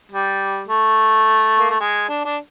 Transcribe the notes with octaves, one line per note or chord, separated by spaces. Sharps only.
G3
A3
A#3
A3
G#3
D4
D4